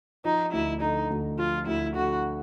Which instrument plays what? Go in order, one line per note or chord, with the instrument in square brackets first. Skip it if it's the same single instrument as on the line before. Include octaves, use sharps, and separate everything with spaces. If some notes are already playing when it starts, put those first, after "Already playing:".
[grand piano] F3 [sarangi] D#4
[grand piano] D2 [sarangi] E4
[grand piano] D3 [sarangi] D#4
[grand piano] D2
[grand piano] F3 [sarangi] F4
[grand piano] D2 [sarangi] E4
[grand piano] D3 [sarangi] F#4